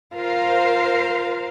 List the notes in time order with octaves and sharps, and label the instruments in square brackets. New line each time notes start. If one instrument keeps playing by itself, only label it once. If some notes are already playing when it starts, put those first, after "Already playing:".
[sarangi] F4 [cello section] A#4 C5 F5